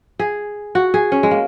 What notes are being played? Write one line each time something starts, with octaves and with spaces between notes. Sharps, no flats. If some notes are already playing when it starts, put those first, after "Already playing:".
G#4
F#4
G#4
C#4
G#3
A#3